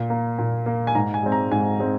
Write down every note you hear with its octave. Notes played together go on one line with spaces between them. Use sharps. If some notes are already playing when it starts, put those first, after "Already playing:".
Already playing: A#2
A#3
A#2
A#3
G#5
G#2 A#5
G#5
G#3 C4
A#5
G#2 G#5
G#3 C4